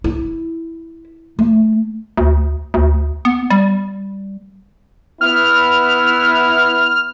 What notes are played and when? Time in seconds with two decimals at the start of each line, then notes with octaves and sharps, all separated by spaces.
0.04 E4
1.39 A3
2.17 D2
2.74 D2
3.25 B3
3.50 G3
5.21 B3 E4 F6